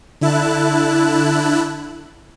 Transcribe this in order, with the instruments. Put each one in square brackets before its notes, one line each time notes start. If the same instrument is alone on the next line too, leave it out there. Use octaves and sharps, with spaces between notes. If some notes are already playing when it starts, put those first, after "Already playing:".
[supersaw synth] D3 E4 A5 F#6